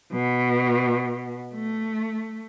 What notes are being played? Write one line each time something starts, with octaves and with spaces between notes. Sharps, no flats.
B2
A3